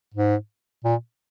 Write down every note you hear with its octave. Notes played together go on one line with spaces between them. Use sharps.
G#2
A#2